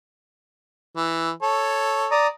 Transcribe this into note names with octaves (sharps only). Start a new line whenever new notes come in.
E3
A4 C#5
D5 A#5 D#6